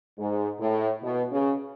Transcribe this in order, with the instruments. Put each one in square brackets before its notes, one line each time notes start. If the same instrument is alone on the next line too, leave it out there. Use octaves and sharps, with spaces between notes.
[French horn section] G#2
A2
B2
C#3